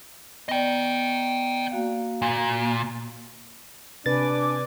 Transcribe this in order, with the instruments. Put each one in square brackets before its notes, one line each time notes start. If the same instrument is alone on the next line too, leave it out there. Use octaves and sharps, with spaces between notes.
[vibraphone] B3 D5 [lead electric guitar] D#5 G5
[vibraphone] A#3 F#4 F5
[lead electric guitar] A#2
[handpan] C3 B4 [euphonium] D4 [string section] D5 G#5 D6 [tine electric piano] A6